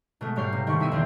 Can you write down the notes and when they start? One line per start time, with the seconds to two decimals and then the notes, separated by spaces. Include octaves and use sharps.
0.21 B2 G#3 A3
0.36 G#2 G3 C#5 F5 G5 C7
0.53 C3
0.67 D#3 G3 A3 C6 C#6
0.80 B2 E4 E5 B6 C7 D#7
0.92 E2 D#3 C4